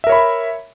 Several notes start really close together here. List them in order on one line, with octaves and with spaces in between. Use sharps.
E5 A#4 C#5 B5